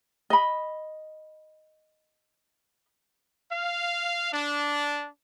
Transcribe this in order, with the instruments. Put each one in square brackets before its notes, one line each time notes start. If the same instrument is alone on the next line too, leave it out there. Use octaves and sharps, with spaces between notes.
[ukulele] D#5 B5
[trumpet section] F5
D4